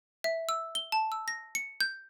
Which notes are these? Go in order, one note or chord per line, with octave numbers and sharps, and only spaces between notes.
E5
E6
G7
A5
E6
A#6
C#7
G6